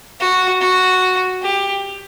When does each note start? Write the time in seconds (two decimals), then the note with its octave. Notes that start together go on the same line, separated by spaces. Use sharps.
0.20 F#4
0.61 F#4
1.42 G4